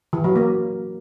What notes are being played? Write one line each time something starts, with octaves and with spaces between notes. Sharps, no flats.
E3
F#3
A#3